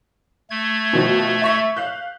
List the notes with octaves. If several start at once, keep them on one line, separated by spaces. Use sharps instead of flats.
A3 G#6
B2 D#3 F3
E5 C#6 B6
F5 F#6 G6